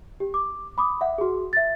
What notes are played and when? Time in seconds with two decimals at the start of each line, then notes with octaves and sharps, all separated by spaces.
0.20 G4
0.34 D6
0.78 B5 D6 D#6
1.01 E5 F#5
1.18 F#4 G#4
1.53 E5 A6